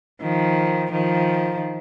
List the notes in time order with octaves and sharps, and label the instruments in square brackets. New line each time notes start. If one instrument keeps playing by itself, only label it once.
[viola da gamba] D#3 F3
D#3 F3